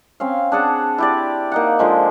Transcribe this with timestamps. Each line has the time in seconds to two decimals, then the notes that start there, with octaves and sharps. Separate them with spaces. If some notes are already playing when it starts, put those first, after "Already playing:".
0.20 C4 C#4 F5
0.52 D4 G#4 F#5 A5
0.98 E4 G4 D5
1.52 A#3 D#4 F#5
1.79 D3 F3 G#3